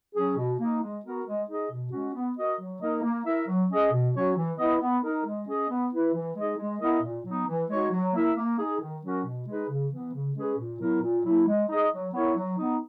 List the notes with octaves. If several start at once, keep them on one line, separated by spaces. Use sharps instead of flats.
F#3 C#4 G#4
B2
A#3 D#4
G#3
B3 F#4 A#4
G#3
D#4 G#4 D#5
B2
G#3 C#4 F#4
B3
F#4 A#4 D#5
F#3
A#3 D#4 A#4 D#5
A#3
E4 A#4 E5
F#3
C#4 G#4 D#5
B2
F#3 C#4 F#4 C#5
E3
B3 E4 B4 D#5
B3
D#4 A#4
G#3
C#4 G#4 D#5
B3
E4 B4
E3
G#3 D#4 G#4 D#5
G#3
B3 E4 A#4 D#5
A#2
F#3 B3 D#4
E3
G#3 D#4 F#4 C#5
F#3
A#3 E4 A#4 E5
A#3
D#4 G#4
D#3
F#3 C#4 F#4 A#4
B2
G#3 D#4 G#4 B4
C#3
E3 B3
C#3
G#3 C#4 G#4 B4
A#2
F#3 B3 E4 A#4
A#2
F#3 A#3 E4
G#3
D#4 G#4 D#5
F#3
B3 E4 A#4 C#5
F#3
B3 D#4